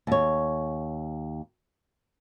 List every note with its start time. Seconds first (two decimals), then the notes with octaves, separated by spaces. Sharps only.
0.07 D#2 C#5